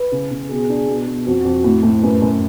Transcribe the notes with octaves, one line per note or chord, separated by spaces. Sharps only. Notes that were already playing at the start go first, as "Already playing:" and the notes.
Already playing: B4
C#3
C#3
B2 G#4
D4
B2
B2
F2 F#4
F2
A2
A2
F#2 B4
F#2